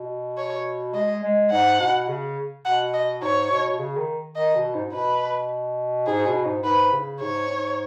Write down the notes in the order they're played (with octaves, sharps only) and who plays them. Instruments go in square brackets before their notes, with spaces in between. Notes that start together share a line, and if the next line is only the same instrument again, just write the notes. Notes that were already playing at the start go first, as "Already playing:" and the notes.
Already playing: [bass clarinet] B2
[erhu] C#5
[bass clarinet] G#3 [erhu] D#5
[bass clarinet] G#3
[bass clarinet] G#2 [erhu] F#5
[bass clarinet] B2
C#3
[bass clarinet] B2 [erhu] F#5
[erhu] D#5
[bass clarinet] G#2 [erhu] C#5
[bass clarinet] B2
B2
C#3
D#3
[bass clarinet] D#3 [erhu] D#5
[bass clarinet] B2
G#2
G#2
[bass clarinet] B2 [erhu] B4
[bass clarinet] G#2 [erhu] G#4
[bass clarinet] B2
G#2
[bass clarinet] G#2 [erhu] B4
[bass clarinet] C#3
[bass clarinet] G#2 [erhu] C#5
[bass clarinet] G#2